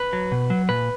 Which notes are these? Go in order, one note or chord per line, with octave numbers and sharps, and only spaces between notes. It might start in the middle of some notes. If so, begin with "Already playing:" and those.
Already playing: B4
F#3
B2
F#3
A#2 B4